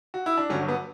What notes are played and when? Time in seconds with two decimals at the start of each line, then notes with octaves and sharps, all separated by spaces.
0.14 F#4
0.26 E4
0.38 D4
0.49 G1 G2 D3 F#3 C#4
0.68 B3